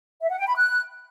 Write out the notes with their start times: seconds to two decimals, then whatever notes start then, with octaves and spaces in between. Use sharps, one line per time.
0.21 E5
0.30 F#5
0.39 G5
0.47 B5
0.56 F#6